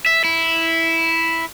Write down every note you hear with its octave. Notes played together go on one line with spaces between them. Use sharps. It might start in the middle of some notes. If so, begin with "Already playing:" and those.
E5
E4